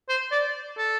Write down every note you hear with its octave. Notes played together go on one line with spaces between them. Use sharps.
C5
D5
A4